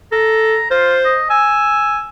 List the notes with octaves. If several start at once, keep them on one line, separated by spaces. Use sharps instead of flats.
A4 A#5
F4 C5
D#5
G#5 E6